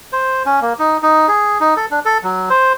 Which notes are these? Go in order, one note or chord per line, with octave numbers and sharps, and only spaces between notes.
C5
C#4
A#3
D#4
D#4
G#4
D#4
A4
D4
A4
F#3
C5